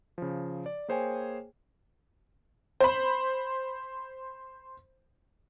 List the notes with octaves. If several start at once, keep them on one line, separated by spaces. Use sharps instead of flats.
C#3 F3
D5
A#3 G#4 C5 C#5 G5 G#5
C5 B5